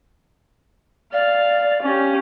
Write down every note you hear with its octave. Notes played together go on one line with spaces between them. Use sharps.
D5 F5
C#4 G4